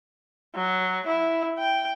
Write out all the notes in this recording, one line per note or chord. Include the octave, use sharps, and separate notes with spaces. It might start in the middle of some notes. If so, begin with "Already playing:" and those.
F#3
E4
G5